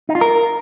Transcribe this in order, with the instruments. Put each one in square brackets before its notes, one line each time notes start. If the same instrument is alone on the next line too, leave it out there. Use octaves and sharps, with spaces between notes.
[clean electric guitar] D#4
F4
A#4